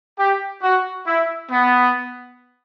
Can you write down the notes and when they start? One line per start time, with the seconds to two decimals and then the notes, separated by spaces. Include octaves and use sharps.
0.19 G4
0.63 F#4
1.07 E4
1.51 B3